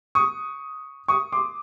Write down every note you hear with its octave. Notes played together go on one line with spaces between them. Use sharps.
C#6 D#6
C#6 D#6
C6 D6